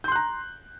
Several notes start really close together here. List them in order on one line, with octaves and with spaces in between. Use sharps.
G6 C6 F#6 A#5